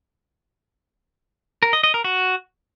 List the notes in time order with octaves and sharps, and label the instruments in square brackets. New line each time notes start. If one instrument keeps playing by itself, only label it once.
[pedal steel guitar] A#4
D#5
D#5
A#4
F#4